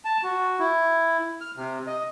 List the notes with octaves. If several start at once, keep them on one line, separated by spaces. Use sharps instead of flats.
A5
F#4
E4
F6
C3
D#5